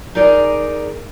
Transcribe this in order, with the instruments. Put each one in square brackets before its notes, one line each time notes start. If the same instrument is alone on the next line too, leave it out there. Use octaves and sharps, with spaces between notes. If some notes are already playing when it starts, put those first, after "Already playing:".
[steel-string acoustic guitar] D#4 G#4 A#4 D5